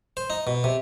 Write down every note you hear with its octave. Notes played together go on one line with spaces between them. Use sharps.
C5
D#4
B2
C3